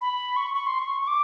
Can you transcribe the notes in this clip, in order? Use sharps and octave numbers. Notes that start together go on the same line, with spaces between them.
B5
C#6
C#6
C6
C#6
C#6
D6